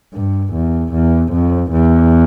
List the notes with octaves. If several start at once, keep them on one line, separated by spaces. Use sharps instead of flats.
G2
E2
E2
F2
E2